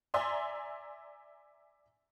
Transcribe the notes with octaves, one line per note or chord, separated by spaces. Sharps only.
D5 E5 G#5 A#5 C6